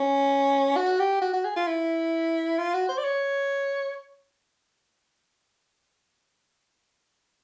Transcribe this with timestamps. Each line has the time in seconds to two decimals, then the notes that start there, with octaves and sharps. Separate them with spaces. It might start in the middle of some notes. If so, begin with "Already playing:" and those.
Already playing: C#4
0.76 F#4
0.99 G4
1.21 F#4
1.33 F#4
1.44 G#4
1.56 F4
1.67 E4
2.58 F4
2.74 F#4
2.89 C5
2.98 D5
3.04 C#5